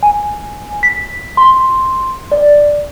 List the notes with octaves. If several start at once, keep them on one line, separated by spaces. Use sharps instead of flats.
G#5
B6
C6
D5